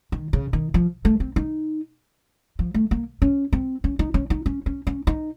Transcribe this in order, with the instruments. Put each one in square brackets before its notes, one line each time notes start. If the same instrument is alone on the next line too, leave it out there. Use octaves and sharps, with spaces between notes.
[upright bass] D#3
C#3
D#3
F3
A3
C4
D#4
F3
A3
A#3
C#4
C4
C#4
D#4
C#4
D#4
C#4
C#4
C#4
D#4